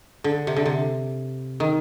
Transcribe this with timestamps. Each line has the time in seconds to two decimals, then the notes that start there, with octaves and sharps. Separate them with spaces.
0.24 D3
0.47 C3
0.56 D3
0.65 C3
1.60 D#3